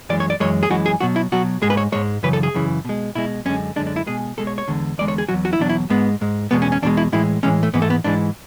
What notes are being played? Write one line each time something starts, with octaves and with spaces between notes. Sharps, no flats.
F#2 E3 G#3 D5
C#5
D5
F#2 E3 G#3 C#5
G#4
F#2 E3 G#3 F#4
G#4
B2 F#3 F#4
E4
B2 F#3 F#4
G#2 G#3 G#4
B4
C#5
G#2 G#3 C#5
F#2 C#3 E3 B4
A4
G#4
F#2 C#3 E3
B2 G#3
B2 G#3 E4
F#2 D3 G#3 C#4
F#2 D3 G#3 D4
D4
E4
B2 G#3 G#4
B2 G#3 A4
C#5
C#5
E2 D3 G#3
E2 D3 G#3 D5
C#5
G#4
E2 B2 F#3 F#4
F#4
E4
E2 B2 F#3 D4
E4
G#2 G#3 B3
G#2 G#3
E2 B2 G#3 B3
C#4
C#4
E2 B2 G#3 D4
E4
A2 E3 G#3 E4
A2 E3 G#3 C#4
A3
G#2 E3 G#3 B3
A3
B3
G#2 E3 G#3 D4